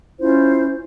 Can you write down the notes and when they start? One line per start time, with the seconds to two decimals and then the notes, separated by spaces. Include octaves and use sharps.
0.19 C#4 E4 F4 C5